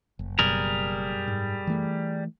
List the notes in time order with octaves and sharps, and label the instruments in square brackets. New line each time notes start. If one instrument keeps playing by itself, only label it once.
[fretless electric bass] F#1
[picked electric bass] F#2 B2 [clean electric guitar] G3 G#4 A#4
[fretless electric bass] G#2
E3 A3